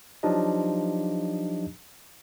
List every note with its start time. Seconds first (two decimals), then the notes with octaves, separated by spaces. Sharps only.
0.23 F3 F#3 D4 D#4 G4 D#5